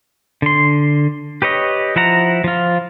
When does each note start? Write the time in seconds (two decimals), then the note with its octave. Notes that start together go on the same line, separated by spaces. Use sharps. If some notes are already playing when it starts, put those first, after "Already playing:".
0.42 D3 C6
1.42 G4 B4 C#5 D#5
1.96 F3 E4 F#5 A#5
2.44 F3 F4